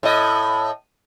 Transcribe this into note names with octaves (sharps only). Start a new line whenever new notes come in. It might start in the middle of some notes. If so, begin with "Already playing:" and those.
A2 D#5